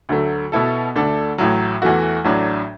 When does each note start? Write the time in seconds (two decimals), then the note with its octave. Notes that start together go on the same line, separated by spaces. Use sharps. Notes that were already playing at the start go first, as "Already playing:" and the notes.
0.09 D2 D3 F#3 A3
0.52 B2 B3 E4 A4
0.95 D2 D3 A3 D4 A4
1.38 A1 A2 F#3
1.82 E2 E3 A3 F#4
2.25 A1 A2 F#3 D4